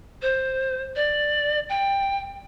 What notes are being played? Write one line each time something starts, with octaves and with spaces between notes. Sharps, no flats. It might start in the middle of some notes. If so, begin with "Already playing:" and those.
C5
D5
G5